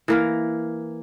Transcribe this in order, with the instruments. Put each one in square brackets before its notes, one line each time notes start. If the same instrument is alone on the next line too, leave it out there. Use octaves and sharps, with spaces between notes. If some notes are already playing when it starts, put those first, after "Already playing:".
[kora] E3 A#3 A#4